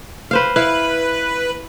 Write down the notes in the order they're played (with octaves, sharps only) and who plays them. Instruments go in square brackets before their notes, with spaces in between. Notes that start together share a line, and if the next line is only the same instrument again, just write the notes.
[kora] B4 C5 F5
[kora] E4 F5 [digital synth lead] B4